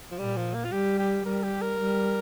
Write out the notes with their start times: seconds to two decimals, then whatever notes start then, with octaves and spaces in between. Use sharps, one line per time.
0.11 F3
0.18 A#2 G3
0.36 F3
0.54 A#3
0.64 F4
0.72 G3 G4
0.99 G4
1.25 G3 A#4
1.43 G4
1.62 A#4
1.79 G3